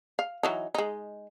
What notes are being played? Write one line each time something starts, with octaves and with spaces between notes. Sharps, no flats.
F5
E3 F#3 D#4
G#3 D#4